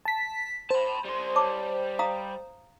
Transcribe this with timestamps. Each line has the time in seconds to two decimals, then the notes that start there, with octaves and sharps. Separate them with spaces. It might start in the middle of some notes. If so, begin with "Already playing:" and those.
0.05 A5 B6
0.70 C5 A5 B5
1.05 G3 C6
1.36 C#5 A5 D6
1.99 F5 A#5 D#6